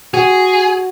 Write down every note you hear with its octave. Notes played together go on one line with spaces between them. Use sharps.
F#4 G#4